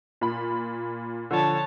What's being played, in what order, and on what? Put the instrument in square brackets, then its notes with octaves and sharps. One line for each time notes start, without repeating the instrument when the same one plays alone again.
[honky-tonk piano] A#2 B5
[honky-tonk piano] D3 F3 [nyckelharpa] C#5 A5